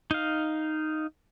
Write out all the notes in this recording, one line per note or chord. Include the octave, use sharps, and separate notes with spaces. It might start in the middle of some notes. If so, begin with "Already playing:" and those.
D#4 F5